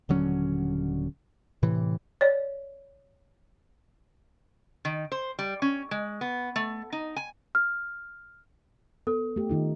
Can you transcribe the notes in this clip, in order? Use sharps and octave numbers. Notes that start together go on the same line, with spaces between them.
D#1 D3 F#3 C#4
A2 C3 E3
C#5 D5
D#3
C5
G3
C#4
G#3
B3
A3
D#4
G#5
F6
B3 A4
A3 G4
D#3 D#4 F4